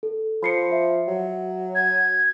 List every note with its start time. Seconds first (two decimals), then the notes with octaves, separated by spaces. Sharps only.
0.03 A4
0.43 F3 B5 C7 C#7
0.72 E5
1.08 F#3
1.75 G#6